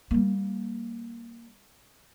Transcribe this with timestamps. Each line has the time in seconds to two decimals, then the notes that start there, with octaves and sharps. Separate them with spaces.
0.11 G3 A#3